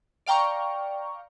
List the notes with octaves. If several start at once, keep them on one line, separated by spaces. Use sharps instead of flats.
D5 F5 G5 A#5 C#6